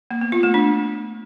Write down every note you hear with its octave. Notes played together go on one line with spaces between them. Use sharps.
A#3
B3
F4
A3
D4